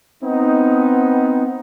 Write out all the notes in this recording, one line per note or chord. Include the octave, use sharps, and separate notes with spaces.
B3 C4 D#4